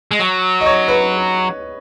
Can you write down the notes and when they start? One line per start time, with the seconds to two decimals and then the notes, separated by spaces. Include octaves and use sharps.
0.11 G#3
0.20 F#3
0.61 D#5
0.66 C#5
0.88 B4